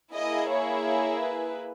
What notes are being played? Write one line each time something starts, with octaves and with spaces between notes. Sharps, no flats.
A#3 E4 G#4 D#5
C#5
C#5
B4